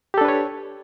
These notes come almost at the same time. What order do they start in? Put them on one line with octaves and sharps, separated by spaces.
G4 A4 D4 B4 C#5